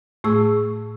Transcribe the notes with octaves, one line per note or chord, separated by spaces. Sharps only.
A2 A3 G#4 C#6 E6